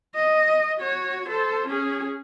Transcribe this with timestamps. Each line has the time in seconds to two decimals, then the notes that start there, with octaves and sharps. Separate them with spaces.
0.15 D#5
0.79 F#4 C#5
1.29 A4 C5
1.68 C#4 G#4